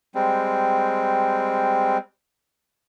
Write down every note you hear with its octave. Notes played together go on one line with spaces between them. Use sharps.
G3 G#3 C4